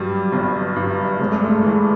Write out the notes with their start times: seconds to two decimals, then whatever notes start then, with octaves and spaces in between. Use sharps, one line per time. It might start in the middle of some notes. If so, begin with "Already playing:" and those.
Already playing: G2 F#3 G3
0.32 G1
0.76 G2
1.20 G1 G#3
1.32 A3
1.44 G#3
1.63 E3